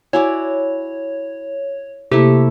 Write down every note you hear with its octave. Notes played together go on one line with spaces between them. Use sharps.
E4 F#4 C#5 D5 G#5
C3 A3 A#3 E4 G4